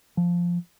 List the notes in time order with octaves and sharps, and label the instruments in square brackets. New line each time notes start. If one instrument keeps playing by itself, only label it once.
[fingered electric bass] F3